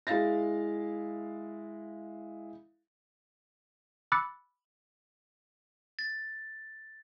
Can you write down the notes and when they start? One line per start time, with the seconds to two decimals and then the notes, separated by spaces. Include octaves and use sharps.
0.07 G#3 E4 F5 A6 A#6
4.12 B5 D6 E6 F#6 A6 C#7
5.99 A6